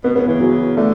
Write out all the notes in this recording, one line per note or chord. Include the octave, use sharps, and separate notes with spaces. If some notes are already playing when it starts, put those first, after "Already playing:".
B2 B3
C#3 B3
C#3 E3
F#3
D3 A3